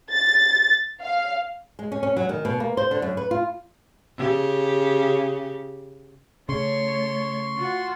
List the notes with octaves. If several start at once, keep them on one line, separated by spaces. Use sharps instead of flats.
A6
F5
G#3
C#4
C#4
F#3
D#3
B2
A#3
C5
D3
F#2
B4
F4
C#3 G4
C#3 A3 C#5 C6 C#6
F4 F#4